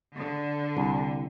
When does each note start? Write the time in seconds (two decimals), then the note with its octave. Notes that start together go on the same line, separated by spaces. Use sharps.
0.15 D3
0.77 C2